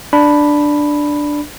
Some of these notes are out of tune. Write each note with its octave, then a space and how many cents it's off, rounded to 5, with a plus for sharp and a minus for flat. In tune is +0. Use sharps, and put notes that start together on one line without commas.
D4 +0 B5 +0